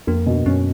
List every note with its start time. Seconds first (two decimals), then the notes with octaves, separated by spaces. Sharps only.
0.07 F2 A#3
0.26 B2
0.46 F#2 C#4